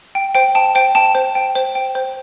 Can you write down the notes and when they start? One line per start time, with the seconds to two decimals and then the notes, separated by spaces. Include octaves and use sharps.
0.15 G5
0.35 C5 G5
0.55 G5 A5
0.75 C5 G5
0.95 G5 A5
1.15 C5
1.35 G5
1.55 C5
1.75 G5
1.95 C5